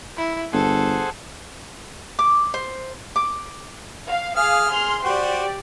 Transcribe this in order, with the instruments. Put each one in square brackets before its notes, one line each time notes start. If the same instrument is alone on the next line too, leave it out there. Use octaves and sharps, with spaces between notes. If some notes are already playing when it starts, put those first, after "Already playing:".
[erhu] E4
[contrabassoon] G1 [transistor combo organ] G#4 C5 F#5 [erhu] A4
[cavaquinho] D6
C5
D6
[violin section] F5
[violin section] G#4 F5 [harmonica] D#6 F6
[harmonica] G#4 [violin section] C6 F6
[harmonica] F#4 C5 [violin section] G4 D5